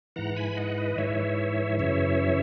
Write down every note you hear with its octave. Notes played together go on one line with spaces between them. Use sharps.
G#2 E3 F#5 A#5
G#5 B5
D#5 F#5
B4 D#5
G#2 E3 C#5 E5
F#2 C#3 E3 C#5 E5